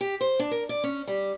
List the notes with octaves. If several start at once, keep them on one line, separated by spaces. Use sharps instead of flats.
G4
C5
D4
A#4
D5
C#4
G3